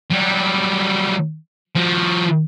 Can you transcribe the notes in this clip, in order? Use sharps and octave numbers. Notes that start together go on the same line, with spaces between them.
F#3 G3
F3 F#4